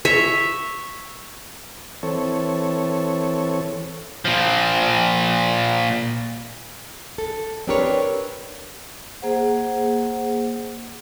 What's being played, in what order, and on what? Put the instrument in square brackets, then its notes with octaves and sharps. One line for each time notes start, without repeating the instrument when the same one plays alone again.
[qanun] C#5 E5
[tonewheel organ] E3 C4 A4 C#5
[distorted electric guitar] A#2 F3
[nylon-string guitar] A4
C4 D4 G4 A#4 B4 C#5
[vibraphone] A#3 G#4 C5 F#5